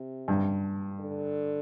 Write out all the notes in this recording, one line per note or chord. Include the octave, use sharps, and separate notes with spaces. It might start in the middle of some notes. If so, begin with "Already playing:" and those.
Already playing: C3
G2
D3